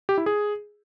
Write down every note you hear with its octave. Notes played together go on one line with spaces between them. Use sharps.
G4
E4
G#4